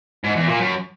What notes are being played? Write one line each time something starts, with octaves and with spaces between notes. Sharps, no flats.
G#2
E2
A#2
F#2